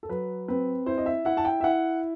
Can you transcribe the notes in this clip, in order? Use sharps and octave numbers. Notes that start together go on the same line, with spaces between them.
A4
F#3 B4
C4 B4
E4 C5
D#5
E5
E4 F#5
A5
G5
E5
E4 F#5